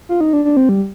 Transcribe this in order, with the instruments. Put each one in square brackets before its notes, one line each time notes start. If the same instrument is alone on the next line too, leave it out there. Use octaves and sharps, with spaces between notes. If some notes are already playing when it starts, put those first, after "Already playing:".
[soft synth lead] F4
D#4
D4
D4
C4
G3